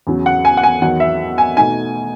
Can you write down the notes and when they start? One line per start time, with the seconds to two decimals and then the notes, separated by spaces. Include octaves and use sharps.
0.07 E2 C#3 F#3
0.26 F#5
0.45 G#5
0.57 F#5
0.63 G#5
0.82 E2 D#3 F#3 F#5
1.00 E5
1.38 G#5
1.57 B2 A3 D#4 G#5